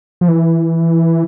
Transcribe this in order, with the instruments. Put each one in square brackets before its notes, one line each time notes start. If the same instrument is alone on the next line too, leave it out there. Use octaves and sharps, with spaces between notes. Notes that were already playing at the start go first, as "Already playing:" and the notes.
[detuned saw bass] F3
E3